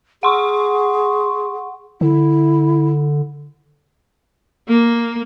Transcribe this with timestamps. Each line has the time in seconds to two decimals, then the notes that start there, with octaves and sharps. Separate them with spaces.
0.23 G#4 F#5 C6 C#6
2.01 D3 E4
4.68 A#3